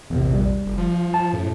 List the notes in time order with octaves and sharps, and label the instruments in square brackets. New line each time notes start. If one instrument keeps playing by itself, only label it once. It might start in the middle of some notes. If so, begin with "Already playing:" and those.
[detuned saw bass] A#1 [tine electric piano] E2 C3
[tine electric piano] G3
[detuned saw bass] F#1
F3
[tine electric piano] A5
[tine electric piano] F#2 [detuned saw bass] A2